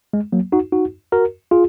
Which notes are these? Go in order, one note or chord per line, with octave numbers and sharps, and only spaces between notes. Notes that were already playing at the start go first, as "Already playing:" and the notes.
G#3
F#3 A#3
D#4 F#4
D#4 F#4
F#4 A#4
F4 G#4